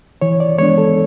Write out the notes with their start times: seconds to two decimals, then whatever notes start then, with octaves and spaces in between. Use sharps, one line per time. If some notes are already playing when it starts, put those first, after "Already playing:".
0.21 E3 C#5
0.40 D5
0.58 G#3 B3 D4 C#5
0.78 A4